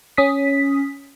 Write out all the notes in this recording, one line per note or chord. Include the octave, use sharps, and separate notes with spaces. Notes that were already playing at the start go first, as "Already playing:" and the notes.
C#4 D#6 B6